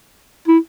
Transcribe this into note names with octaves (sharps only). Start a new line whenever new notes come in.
E4